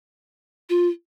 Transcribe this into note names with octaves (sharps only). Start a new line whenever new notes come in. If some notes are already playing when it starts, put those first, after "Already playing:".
F4